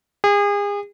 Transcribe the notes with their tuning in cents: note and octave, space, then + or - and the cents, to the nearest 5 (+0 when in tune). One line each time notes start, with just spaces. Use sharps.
G#4 -35